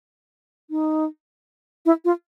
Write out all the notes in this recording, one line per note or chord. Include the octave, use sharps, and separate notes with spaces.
D#4
E4
F4